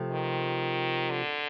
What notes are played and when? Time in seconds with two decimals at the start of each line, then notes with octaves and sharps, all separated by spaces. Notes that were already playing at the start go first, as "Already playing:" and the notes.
Already playing: C3 F3 A3
0.12 D#3
1.10 D3